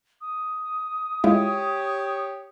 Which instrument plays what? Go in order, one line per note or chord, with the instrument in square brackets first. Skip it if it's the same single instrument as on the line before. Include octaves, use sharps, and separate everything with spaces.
[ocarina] D#6
[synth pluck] G#3 E4 F4 [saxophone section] G4 C#5